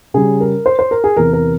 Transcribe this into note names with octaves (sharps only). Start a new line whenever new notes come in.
C#3 G3 C#4 G#4
A#4
C5
C5
A#4
G#4
E2 C3 E3 A#4
A#4